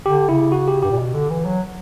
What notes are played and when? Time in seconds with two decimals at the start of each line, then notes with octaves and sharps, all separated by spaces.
0.05 D3 G4
0.29 C#3 E4
0.52 F#4
0.68 G4
0.83 G2 G4
0.91 A#2
0.98 B2
1.14 D3
1.30 E3
1.45 F#3